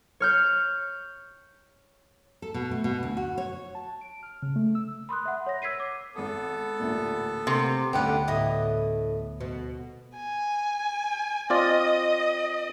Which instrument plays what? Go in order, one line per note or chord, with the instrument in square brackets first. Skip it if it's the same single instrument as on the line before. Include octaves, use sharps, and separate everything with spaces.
[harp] C#5 F6 G6
[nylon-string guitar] A4
B2
A3
B2
D2
F#4
C#5
[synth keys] A5
D7
F6
C#3
A3
E6
[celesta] B5 C6 D#6 F#6
E5 F#5
C#5 A#6
E6 G#6 B6 C7 D#7
D6
[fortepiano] G#1 D#6 [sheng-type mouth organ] B3 A4
[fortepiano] A1 D2 A#2
[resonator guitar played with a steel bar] C3 [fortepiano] A3 A#3
[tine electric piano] D2 B3 [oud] D3 A3 C#4 [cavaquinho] G4 B4 F#5
[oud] A2 [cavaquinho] E4 D#5 D#6
[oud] B2
[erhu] G#5
[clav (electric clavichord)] C4 F4 D5 [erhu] D#5